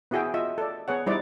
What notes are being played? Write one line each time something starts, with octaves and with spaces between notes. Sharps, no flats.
B3 E4 F#4 G#4 E5 G5
F4 D#5 E5
A4 D5
B3 G#4 C#5 F#5
G3 D#4 E4 C5 D5